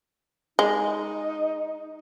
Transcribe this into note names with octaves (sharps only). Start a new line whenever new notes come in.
G#3 D#4